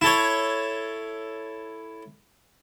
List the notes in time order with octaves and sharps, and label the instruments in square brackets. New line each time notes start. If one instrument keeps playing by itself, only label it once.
[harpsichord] E4 A4 C#5